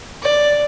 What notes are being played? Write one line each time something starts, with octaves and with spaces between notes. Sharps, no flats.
D5